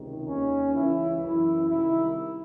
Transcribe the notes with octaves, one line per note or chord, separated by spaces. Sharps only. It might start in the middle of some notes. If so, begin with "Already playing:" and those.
Already playing: C#2 C3 D#3
D#2 D#3 C#4
C#2 C#3 E3 E4
F#2 E3 E4
C2 C3 D#3 E4